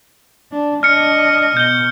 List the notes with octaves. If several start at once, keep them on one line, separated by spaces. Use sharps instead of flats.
D4
D4 D#5 F6 C#7
B2 G6 G7